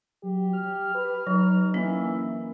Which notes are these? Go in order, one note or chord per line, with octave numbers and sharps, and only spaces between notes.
F#3 G4
F6
B4
F#3 D#4
E3 A#3 C#4